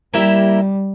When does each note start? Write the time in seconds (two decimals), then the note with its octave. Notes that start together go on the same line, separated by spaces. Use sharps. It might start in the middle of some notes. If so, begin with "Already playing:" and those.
0.14 G3 A#3 E4 G4 A#4 E5